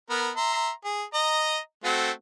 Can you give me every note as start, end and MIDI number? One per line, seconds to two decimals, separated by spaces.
0.10 0.30 59
0.10 0.30 70
0.37 0.70 76
0.37 0.70 82
0.37 0.70 84
0.85 1.03 68
1.14 1.58 75
1.14 1.58 82
1.84 2.11 57
1.84 2.11 60
1.84 2.11 66